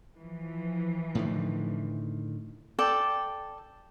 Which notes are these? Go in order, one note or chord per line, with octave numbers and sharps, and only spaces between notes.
E3 F3
A2 D3 D#3
A4 D5 G5